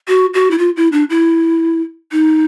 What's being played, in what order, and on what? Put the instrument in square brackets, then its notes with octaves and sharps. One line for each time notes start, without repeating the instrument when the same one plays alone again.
[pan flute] F#4
F#4
E4
F4
E4
D4
E4
D#4